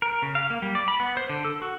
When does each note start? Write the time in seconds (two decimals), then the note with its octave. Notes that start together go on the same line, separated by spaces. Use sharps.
0.02 A#4
0.22 C#3
0.35 F5
0.50 A#3
0.62 G3
0.75 D5
0.88 B5
1.00 B3
1.17 C5
1.29 D3
1.45 A4
1.62 F#4